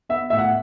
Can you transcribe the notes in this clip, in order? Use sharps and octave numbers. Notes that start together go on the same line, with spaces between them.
B3 E5
A2 E5
F#5